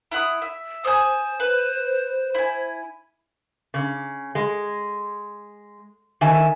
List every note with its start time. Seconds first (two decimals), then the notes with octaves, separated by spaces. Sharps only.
0.12 E4 F#5 D#6
0.42 E5
0.85 C5 G#5 D#6
1.40 B4
2.35 E4 G#5
3.74 C#3
4.35 G#3
6.21 D#3 E5 G#5